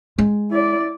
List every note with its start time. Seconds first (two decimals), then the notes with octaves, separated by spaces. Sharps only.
0.18 G#3
0.51 E4 D5